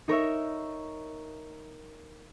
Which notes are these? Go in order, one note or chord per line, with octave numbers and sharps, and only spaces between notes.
D#4 A#4 C#5 E5